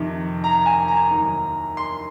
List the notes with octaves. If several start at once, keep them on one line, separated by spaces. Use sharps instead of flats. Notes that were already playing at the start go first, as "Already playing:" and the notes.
Already playing: F2 C3 D#3
A#5
G#5
A#5
D#2 D#3 F#3
C6